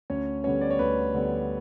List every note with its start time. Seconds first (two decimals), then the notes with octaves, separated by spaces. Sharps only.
0.10 D2 C#4 C#5
0.44 D3 G3 B3 C#4 C#5
0.61 D5
0.70 C#5
0.79 D2 B4
1.14 D3 G3 B3